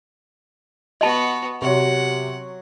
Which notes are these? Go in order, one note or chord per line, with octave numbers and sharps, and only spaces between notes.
B3 F#4 D#5 A5
C3 F#3 F#5 C6 C#6